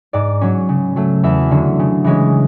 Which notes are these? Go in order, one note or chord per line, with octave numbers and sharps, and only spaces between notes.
G#2 D5
F#3 C#4
C#3
F#3 A3
E2 E5
D3 F#3
C#3
E3 G#3 C#4